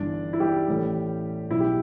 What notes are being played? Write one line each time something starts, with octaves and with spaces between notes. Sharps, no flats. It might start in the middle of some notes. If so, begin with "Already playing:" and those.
Already playing: G1 G2 E3 D4 D5
E4
G3 G4
A1 A2 E3
B1 B2 E4
G4